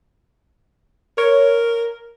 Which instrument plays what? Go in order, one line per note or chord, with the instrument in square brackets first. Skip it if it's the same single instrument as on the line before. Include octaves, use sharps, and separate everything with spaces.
[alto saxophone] A#4 [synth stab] C#5